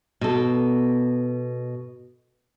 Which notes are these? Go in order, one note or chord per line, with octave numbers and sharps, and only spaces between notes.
B2 A4